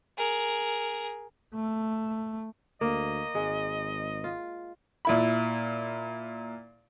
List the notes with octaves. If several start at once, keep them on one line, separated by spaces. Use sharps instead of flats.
G#4 A#4
A3
D2 A#3 D#5
G#1 G#3
F4
A#2 E4 B5